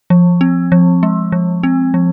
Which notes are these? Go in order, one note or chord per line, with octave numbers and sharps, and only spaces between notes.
F3
C4
F3
G#3
F3
C4
F3